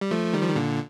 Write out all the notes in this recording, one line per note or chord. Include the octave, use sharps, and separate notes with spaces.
G3
F3 A3
D#3 G3
F3
D#3
A#2 D3